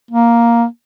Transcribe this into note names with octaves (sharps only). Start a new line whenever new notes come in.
A#3